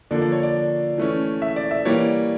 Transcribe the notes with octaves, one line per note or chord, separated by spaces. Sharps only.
D3 F3 A#3 D4 D5
D5
C#5
D5
E3 A3 C#4
E5
D5
E5
E3 G3 A#3 C#5